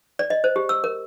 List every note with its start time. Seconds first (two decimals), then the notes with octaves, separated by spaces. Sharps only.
0.19 D5
0.30 D#5
0.44 C5
0.56 G4
0.69 E6
0.84 A#4